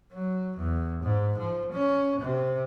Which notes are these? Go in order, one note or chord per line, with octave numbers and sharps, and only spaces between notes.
F#3
E2
G#2
F3
C#4
C3